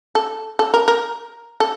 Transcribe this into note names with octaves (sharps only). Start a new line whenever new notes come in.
A4
A4
A#4
A#4
A4